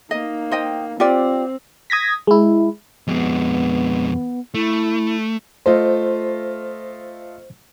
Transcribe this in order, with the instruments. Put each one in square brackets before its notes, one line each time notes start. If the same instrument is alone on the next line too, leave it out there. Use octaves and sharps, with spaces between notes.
[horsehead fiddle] A#3 D#4 [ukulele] D#5
[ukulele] C5 D#5 G5
[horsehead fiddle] C4 [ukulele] F4 G4 D5
[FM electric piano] D#6 G#6 A#6 B6
G#3 E4
[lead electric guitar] F2 G#3 [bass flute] B3
[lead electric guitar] A3 [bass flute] E4
[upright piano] A3 F4 D#5 [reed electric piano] C5